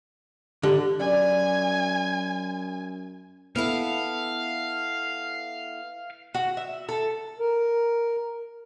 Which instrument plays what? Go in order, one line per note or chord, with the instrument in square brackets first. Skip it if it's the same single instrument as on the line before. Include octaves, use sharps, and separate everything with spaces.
[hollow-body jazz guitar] D3 [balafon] G4
[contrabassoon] F#2 [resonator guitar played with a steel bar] D5 [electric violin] G#5
[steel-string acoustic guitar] B3 E4 A4 [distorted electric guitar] F5
[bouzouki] F#4
E5
A4
[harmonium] A#4